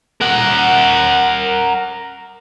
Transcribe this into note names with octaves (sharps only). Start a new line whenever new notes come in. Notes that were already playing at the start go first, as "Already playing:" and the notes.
A#4 F#5